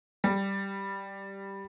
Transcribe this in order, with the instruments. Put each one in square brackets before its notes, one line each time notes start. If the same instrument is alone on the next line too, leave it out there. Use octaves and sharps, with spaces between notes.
[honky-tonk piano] G3